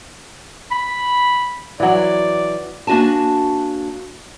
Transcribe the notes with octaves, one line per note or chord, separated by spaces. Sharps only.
B5
E3 F#3 D5
A#3 D4 F#4 G#5 A5